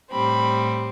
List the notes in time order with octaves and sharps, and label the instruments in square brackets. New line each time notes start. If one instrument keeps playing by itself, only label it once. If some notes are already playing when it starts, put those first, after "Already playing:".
[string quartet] A2 G3 C4 B5